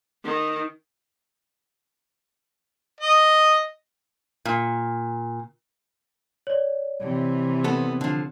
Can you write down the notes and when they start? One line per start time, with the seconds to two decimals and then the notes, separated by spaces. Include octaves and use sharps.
0.24 D#3
3.00 D#5
4.45 A#2
6.47 C#5 D5
7.01 C3 E3
7.64 B3 A4
8.01 D3 F3